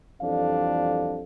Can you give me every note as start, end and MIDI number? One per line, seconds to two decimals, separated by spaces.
0.22 1.22 41
0.22 1.22 52
0.22 1.22 55
0.22 1.22 62
0.22 1.22 69
0.22 1.22 77